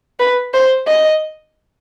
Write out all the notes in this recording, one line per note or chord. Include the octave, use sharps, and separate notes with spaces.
B4
C5
D#5